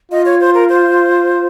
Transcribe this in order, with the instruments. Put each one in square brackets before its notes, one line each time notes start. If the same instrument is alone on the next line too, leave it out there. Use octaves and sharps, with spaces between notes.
[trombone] F4 [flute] D#5
[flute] C#5
C5
A#4
C5